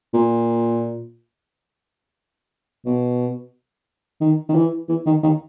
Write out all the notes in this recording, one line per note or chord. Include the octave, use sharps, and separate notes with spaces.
A#2
B2
D#3
D#3
E3
E3
D#3
D#3